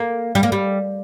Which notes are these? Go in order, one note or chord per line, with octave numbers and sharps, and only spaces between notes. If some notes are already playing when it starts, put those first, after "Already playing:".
Already playing: A#3
G3
A#3
G3